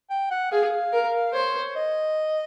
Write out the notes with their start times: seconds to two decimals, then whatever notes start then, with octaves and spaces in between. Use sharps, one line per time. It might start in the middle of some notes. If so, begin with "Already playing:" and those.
0.10 G5
0.31 F#5
0.52 G#4 F5
0.93 A#4
1.33 C5 C#5
1.75 D#5